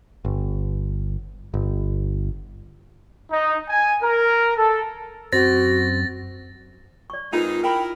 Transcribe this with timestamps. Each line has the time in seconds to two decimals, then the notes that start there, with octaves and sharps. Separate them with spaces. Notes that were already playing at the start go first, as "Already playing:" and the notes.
0.25 G1
1.54 G1
3.31 D#4
3.69 G#5
4.02 A#4
4.57 A4
5.33 F#2 C4 F#4 A6 A#6
7.10 D5 C#6
7.33 G#2 C4 D#4 F4 A#4 B4 A#5
7.64 E4 A#4 G5 B5